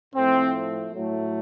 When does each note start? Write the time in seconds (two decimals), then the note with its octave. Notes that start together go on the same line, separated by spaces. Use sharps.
0.14 A2 F3 A3 C4
0.93 A2 F#3 A3